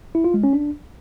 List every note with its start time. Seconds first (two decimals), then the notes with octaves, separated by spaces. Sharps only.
0.15 E4
0.24 F4
0.34 G#3
0.44 C#4
0.53 D4